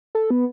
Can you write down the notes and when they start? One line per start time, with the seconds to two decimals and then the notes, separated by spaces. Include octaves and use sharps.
0.15 A4
0.31 B3